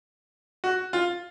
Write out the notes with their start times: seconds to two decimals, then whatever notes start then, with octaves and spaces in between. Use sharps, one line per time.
0.64 F#4
0.93 F4